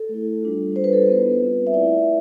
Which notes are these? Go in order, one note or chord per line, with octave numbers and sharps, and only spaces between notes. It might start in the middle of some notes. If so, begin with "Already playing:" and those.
Already playing: A4
A3 E4
G3 D4 F4
G3 D4 F4 C5
B4
A4
B4
B3 E4
G3 C4 F4
E5
A3 E4 D5